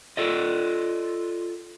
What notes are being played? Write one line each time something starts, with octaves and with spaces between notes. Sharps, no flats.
F4 A4 D5 D#5